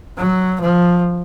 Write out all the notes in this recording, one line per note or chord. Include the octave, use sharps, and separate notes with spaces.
F#3
F3